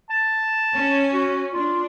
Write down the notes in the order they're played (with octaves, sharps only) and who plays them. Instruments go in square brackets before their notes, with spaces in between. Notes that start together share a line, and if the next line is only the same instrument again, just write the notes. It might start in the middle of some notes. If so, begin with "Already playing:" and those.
[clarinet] A5
[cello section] C#4
[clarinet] F#4
[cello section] D4 [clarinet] F4